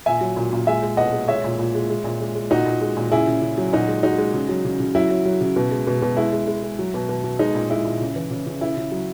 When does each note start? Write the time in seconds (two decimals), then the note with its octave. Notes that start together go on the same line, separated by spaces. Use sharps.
0.06 A#2 E5 G#5
0.21 F#3
0.36 A#2
0.53 A#2
0.67 G#3 E5 G#5
0.82 G#3
0.97 B2 D#5 F#5
1.13 G#3
1.28 G#3 C#5 E5
1.44 A#2
1.59 A#2
1.75 G#3
1.90 G#3
2.04 A#2
2.21 G#3
2.35 G#3
2.50 A#2 D#4 F#4
2.66 A#2
2.81 G#3
2.97 A#2
3.12 C#3 E4 G#4
3.27 C#3
3.42 C#3
3.58 F#3
3.73 A#2 D#4 F#4
3.88 G#3
4.03 G#3 D#4 F#4
4.18 G#3
4.34 C#3
4.49 F#3
4.65 C#3
4.80 C#3
4.95 F#3 E4
5.10 F#3
5.25 F#3
5.41 C#3
5.56 B2
5.71 G#3
5.87 B2
6.02 B2
6.17 G#3 E4
6.33 G#3
6.47 G#3
6.63 G#3
6.79 F#3
6.94 B2
7.09 B2
7.24 B2
7.39 G#3 D#4
7.55 A#2
7.70 G#3 E4
7.85 A#2
8.00 C#3
8.16 E3
8.31 C#3
8.47 C#3
8.61 C#3 E4
8.77 C#3
8.92 F#3